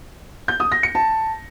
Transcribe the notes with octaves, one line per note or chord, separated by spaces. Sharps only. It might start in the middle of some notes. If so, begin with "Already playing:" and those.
G6
D#6
A#6
C#7
A5